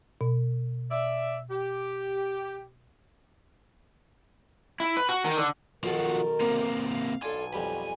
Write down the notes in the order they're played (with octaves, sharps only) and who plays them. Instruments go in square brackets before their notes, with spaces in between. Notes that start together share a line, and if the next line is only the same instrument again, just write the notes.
[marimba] B2
[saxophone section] D5 E5
G4
[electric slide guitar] E4
B4
F#4
D#3
D3
[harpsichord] B1 D#3 A5 [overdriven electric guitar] F3 F#4 [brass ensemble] A#4
[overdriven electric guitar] C3 A#3
[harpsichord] F5
[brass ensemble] B1 [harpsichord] D4 F4 A4 [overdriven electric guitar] G#5
[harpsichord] F2 G3 B4